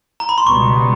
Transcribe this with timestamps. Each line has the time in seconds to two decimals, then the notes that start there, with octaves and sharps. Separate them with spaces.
0.20 A#5
0.29 B5
0.38 C6
0.47 C#2 B2 G3 B3 C#6